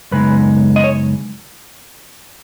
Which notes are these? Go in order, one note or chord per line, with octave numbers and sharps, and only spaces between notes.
F#2 C#3 G#3 B3 D#4 B4
D#5
C#5